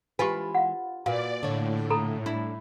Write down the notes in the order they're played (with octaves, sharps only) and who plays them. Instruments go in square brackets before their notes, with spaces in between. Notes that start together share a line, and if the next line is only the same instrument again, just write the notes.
[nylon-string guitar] E3 G#3 [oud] F4 B4 [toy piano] G4 G#5
[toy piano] F5 F#5
[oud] A#2 [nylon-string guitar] F#4 B4 [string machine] D5 [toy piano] F5
[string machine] A2 [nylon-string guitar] D3 C#5
[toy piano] A4 A#5 B5
[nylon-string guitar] D4 [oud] E4